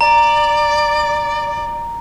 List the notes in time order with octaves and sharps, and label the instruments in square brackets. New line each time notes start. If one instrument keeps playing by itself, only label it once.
[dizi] D5 [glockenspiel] A#5